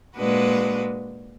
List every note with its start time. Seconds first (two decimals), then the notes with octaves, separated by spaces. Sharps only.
0.16 A#2 G#3 D4 F#4 B4